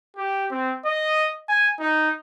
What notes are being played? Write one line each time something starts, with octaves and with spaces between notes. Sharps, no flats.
G4
C4
D#5
G#5
D#4